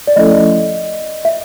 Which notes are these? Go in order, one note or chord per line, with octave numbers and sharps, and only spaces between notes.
D5
F3 A3 C#4 E4 A4 D#5
E5